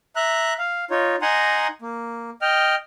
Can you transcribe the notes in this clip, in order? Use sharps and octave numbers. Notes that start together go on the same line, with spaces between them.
E5 A#5 F#6
F5
D#4 F4 C#5
D#4 F#5 G#5 A#5 C6
A#3
D#5 G5 F6